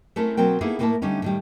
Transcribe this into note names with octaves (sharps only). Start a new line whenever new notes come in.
A3 C4 C#4 E4 A4 A#4
B2 F#3 C4 A#4 G5
A#3 B3 D#4 E4 G#4 A4
A2 A#3 C4 E4 A#4 A5
D3 G3 A3 C#4 D#4
A2 D#3 G3